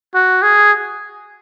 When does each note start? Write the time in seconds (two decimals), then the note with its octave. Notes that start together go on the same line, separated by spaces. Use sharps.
0.15 F#4
0.42 G#4